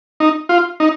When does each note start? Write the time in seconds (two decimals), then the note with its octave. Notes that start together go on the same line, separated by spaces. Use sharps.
0.20 D#4
0.49 F4
0.80 D#4